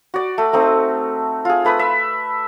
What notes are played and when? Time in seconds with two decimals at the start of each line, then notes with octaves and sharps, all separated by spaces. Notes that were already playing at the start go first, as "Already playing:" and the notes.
0.14 F#4 D5
0.38 A3
0.53 A3 C4 D#4
1.45 F4 G#4
1.65 A3 B4 B5 D#6
1.79 E5